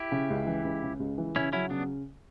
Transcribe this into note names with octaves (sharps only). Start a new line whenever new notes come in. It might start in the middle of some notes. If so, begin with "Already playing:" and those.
Already playing: E4 G4
C#3
C#2
E3
C#2
C#3
C#2
E3
C#3 C#4 E4
F#3 C#4 E4
C#3 B3 D4